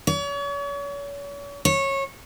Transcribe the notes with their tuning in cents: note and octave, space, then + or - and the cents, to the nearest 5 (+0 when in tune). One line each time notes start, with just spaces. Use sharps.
C#5 +40
C#5 -20